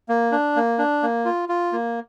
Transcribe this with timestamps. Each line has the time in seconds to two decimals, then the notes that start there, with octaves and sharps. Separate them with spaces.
0.09 A#3
0.32 D4
0.56 A#3
0.79 D4
1.03 A#3
1.25 F4
1.49 F4
1.72 A#3